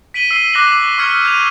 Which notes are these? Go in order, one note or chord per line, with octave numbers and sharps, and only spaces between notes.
B6 D7 D#7 F#7 G7
E6 C7 D#7 G7
D6 F#6 A#6 C7 F#7 G7
C#6
C#6 E6 F6 G#6 C7 C#7
G6 G#6 D#7 F7